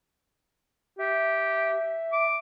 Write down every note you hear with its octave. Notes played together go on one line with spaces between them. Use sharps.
G4 E5
D6